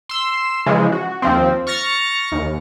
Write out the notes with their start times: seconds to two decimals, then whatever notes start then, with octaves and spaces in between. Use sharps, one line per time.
0.09 C6 E6
0.66 C#3 E3 F3 G#3
0.92 F#4
1.22 D#2 F3 C4
1.67 C#6 F6 A6 A#6 C#7
2.32 D#2